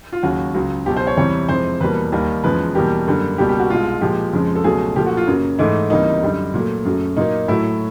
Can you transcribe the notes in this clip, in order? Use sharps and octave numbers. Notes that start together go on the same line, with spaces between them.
F4
D#2 C#3 F#3 F#4
C#2 C#3 F#3
C#2 B2 F#3 G4
C5
C#5
E2 C3 E3 G3 C#5
F2 C3 E3 G#3 C5
E2 B2 G3 A#3 B4
D#2 D#3 G3 A#3
E2 C#3 F3 G#3 B4
E2 B2 G3 A#3 G4
F#2 D3 G3 A#3
C#2 B2 G3 A#3 G4
G4
F#4
C2 B2 G#3 F4
A#2 F3 G#3 G4
F2 C#3 F3 G#3
A4
C#2 B2 F#3 A3 G#4
A#2 F3 A3 G4
F#4
F4
F#2 C#3 F#3 A#3
G#2 E3 A3 D#4
C#2 C3 E3 G3 A#3 D#4
F#2 D3 G3
A#2 F#3 A3
F#2 C#3 F#3 A3
A#2 F#3 A#3 D#4
A2 F#3 A3 E4